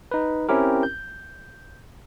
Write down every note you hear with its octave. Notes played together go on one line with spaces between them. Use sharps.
D#4 B4
C4 C#4 E4 G4 A#4
G6